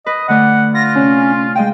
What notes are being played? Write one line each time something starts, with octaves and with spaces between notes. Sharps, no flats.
B4 D#5
D3 A3 D5 F#5
F4 A#6
C3 C#4 D4
G#3 D#5 F5 G5